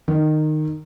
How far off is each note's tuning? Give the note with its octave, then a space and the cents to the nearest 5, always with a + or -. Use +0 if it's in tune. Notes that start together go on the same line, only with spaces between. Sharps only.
D#3 -15